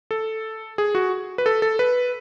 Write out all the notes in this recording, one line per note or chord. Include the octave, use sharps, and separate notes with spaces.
A4
G#4
F#4
B4
A4
A4
B4